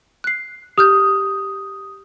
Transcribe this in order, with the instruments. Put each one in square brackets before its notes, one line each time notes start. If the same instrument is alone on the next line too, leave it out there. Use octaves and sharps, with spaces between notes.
[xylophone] F#6 C7
[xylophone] G4 F6 G6 [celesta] D#6